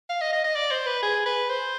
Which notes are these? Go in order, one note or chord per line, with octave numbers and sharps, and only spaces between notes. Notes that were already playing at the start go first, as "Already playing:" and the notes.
F5
D#5
D#5
D#5
D5
C5
B4
G#4
B4
C5